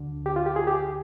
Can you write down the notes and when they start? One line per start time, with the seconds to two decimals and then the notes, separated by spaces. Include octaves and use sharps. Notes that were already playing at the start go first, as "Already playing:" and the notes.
Already playing: D2 D3
0.26 G4
0.36 F4
0.46 G4
0.56 G#4
0.67 G4